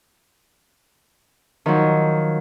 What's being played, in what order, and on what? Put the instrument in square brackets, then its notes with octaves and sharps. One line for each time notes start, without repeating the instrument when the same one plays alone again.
[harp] D#3 F3 F#3